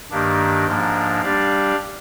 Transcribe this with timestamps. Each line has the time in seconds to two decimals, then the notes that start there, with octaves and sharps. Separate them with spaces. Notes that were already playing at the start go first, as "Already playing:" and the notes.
0.11 G2 D#3 A#3 D4 G4
0.66 G#2 F3 A#3 D4
1.21 G3 D4 G4 D5 F5